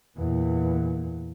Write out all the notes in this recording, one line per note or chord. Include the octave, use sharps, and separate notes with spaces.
E2 A#2